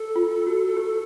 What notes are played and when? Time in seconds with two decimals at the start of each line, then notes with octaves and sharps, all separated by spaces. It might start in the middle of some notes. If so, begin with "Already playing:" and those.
Already playing: A4
0.16 F4
0.47 F#4
0.77 G4